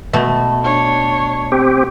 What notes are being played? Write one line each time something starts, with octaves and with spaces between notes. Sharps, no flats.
B2 A3
D4 C#5
C4 G4